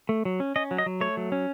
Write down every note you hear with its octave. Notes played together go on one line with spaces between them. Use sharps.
A3
F#3
C#4
C#4 D#5
F#3
D#5
F#3
A3 C#5
F#3
C#4